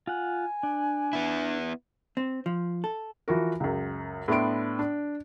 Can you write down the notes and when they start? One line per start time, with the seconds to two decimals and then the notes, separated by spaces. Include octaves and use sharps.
0.07 F4 F#5 G#5
0.63 D4
1.13 B3 E4
2.17 C4
2.46 F3
2.84 A4
3.28 E3 F3 F#4 A#4
3.60 C#2 F#2
4.28 A2 B3 D4 E5 C6 D7
4.79 D4